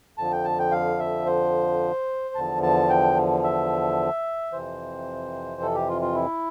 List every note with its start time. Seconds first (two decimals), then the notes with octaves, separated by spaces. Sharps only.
0.17 F2 D3 F3 A5
0.32 G5
0.44 A5
0.59 G5
0.72 F5
0.99 E5
1.26 C5
2.35 E2 D3 F3 A5
2.63 A5
2.90 G5
3.44 E5
4.52 F2 C3 E3 C5
5.62 A4
5.74 G4
5.89 F4
6.02 F4
6.15 E4